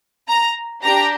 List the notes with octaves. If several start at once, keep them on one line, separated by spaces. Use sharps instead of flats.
A#5
D4 G4 A#5